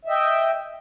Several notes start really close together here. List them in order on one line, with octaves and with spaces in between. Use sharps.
E5 D#5 G5